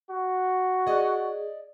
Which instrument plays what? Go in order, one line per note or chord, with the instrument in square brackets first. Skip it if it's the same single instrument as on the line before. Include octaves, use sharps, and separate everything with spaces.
[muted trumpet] F#4
[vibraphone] G#4 [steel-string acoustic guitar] D5 D#5